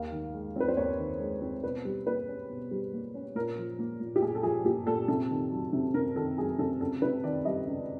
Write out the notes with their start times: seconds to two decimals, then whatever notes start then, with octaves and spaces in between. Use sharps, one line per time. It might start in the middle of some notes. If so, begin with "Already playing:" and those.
Already playing: D#2 F5
0.12 D#3
0.34 G#3
0.56 C4 B4
0.68 C5
0.77 D#2 C#5
0.99 D#3
1.20 G#3
1.41 C4
1.64 B2 B4
1.85 G3
2.06 A#3 B4
2.28 C#4
2.50 B2
2.71 G3
2.93 A#3
3.14 C#4
3.35 A#2 A#4
3.57 F3
3.79 A#3
4.00 A#2
4.16 G4
4.22 A#2 G#4
4.35 A4
4.43 F3 G#4
4.65 A#3 G4
4.87 A#2 A4
5.08 C3 A4
5.30 D#3
5.51 F#3
5.73 C3
5.94 C3 A#4
6.16 D#3 A4
6.38 F#3 G#4
6.59 C3 A4
6.81 C#2 A4
7.02 C3 B4
7.24 D#3 D5
7.45 G3 D#5
7.67 C#2